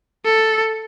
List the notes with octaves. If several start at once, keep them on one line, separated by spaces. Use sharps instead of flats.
A4